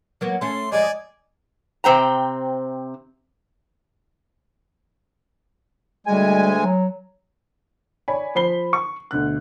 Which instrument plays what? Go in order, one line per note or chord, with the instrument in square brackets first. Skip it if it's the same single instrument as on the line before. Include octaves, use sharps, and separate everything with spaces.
[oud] F#3 A#3 B3
[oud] A3 C#4 [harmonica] C6
[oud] F2 G#3 [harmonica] D5 G#5 [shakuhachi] D#5
[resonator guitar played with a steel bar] C3 C4 G5 A#5
[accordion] D2 G#3 G#5 [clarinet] G3
[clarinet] F#3
[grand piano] C#5 D5 G#5 B5
F3 C5 B5 C7 G7
C#6
D2 B2 F#6